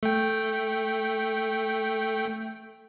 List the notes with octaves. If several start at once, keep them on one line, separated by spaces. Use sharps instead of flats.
A3 G5